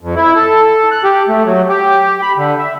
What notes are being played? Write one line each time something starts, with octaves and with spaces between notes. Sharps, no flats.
F2
E4
A4
F#6
G4
A3
F#3
G4
B5
D3
E5